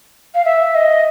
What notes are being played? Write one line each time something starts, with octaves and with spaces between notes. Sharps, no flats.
F5
E5
D#5